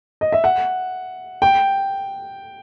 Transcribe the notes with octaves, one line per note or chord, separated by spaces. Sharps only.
D#5
E5
F#5
G5